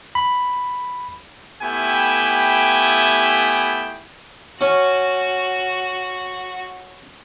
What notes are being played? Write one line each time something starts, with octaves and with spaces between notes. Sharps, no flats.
B5
A3 B3 E4 G4 G5 G#5
C#4 F#4